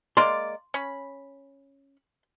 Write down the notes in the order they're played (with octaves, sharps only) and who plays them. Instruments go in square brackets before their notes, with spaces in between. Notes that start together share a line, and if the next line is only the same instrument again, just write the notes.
[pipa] G#3 A#3 D5 [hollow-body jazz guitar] C6
[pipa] C#4 B5